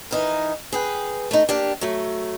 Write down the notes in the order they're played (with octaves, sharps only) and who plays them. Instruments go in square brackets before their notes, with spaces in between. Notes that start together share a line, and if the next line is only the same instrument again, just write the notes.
[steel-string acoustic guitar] E3 D#4 A#4
G#4 B4 G5
A3 D#4
A#3 D4 G4
F#3 A3